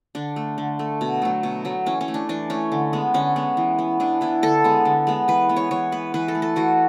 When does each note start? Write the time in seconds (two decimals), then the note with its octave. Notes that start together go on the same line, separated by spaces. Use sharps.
0.15 D3 D4
0.36 A3
0.58 D3
0.79 A3
1.01 B2
1.22 F#3 A3
1.43 B2
1.65 F#3 A3
1.86 E3 C#4
2.01 C#4
2.08 A3
2.14 D4
2.29 E3 D4
2.50 A3 C#4
2.72 D3
2.93 G#3 B3
3.14 D3 C#4
3.36 G#3 B3
3.57 E3
3.78 B3
4.00 E3 D4
4.21 B3 E4
4.43 D3 A4
4.64 G#3 B3
4.85 D3
5.07 G#3 B3
5.28 E3 B4
5.49 B3
5.56 C#5
5.71 E3 C#5
5.92 B3 B4
6.14 E3 B4
6.28 A4
6.35 A3
6.42 A4
6.56 E3 F#4